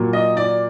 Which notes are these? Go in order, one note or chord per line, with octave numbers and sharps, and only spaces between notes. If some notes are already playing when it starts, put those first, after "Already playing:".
Already playing: A#2 F#3 A#3
D#5
D5